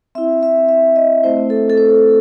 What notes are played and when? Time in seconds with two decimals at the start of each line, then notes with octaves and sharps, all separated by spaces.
0.15 C4 E4 E5
0.43 E5
0.69 E5
0.96 D#5
1.24 A3 C4 E4 C5
1.50 A4
1.70 A4
1.78 C5